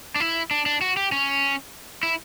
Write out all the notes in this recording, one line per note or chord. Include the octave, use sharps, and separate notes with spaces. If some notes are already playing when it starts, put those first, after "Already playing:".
D4
E4
D4
D4
F#4
G4
C#4
E4